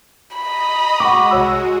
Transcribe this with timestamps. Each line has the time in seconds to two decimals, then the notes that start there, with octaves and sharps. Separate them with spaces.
0.35 D#5 A#5 B5 D#6
1.00 G#3 F#4 F#5 G5 C#6 D6
1.31 C2 C#5 E6